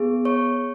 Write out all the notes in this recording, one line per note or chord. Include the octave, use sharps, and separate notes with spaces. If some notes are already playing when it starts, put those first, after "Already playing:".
Already playing: B3 G#4
C#5 C#6